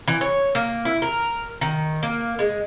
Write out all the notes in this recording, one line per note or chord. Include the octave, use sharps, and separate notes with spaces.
E3
C#5
A#3
E4
A#4
D#3
A#3
G#3